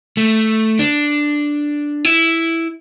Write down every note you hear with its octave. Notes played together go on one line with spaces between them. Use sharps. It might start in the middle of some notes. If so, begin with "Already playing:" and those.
A3
D4
E4